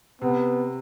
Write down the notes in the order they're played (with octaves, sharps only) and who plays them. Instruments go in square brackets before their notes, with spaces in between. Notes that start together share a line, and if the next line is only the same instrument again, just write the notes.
[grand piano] C3 [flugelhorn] B3